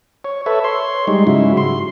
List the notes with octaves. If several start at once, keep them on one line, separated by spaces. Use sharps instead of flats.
C#5
A4 B4 C#5 E5
C#5 C6
G3 G#3 D#4
G#2 C#3 F#3 E4
C6